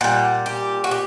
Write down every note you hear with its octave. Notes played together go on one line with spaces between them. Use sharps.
A#2 G3 F#5
G4
F#4
G4